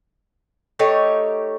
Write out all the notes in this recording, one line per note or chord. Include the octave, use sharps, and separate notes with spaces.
A3 D#4 G4 C#5